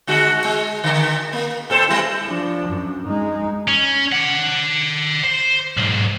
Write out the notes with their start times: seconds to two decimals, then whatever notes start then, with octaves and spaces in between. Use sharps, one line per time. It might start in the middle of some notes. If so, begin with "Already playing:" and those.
0.07 D3 G#3 F#4
0.44 G#3
0.84 D3 D#3
1.33 A#3
1.70 A2 A4 C5
1.88 G3 E4
2.27 F3 D4
2.69 F#2
3.07 G#3 D#4
3.68 C#4
4.13 D5 F#5
5.24 C5
5.77 B1 G#2